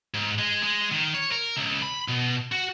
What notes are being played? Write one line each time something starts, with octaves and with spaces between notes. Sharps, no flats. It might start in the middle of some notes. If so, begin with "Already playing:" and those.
G#2
G#3
G#3
D#3
C#5
A#4
C#2
B5
B2
F#4